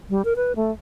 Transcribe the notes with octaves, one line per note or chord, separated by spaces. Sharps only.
G3
A#4
B4
A3